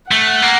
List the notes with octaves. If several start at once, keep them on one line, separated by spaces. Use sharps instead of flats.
A3 F#5
A#3